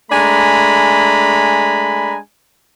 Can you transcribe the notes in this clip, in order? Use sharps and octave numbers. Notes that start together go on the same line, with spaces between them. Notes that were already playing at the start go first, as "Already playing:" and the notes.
G#3 A3 D4 G#5 A#5 B5